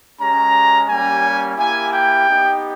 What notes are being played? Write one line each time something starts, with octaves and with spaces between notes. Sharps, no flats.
G#3 C#4 G4 A#5
G3 A#3 C#4 G4 G#5
A#3 E4 G4 G#5
G5
B3 D#4 G4